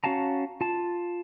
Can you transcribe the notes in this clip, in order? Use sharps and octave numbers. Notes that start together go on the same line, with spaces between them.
C#4 F#4 F5 A5 A#5
F4 A5